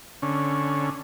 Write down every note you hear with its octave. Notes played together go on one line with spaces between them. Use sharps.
D3 C#4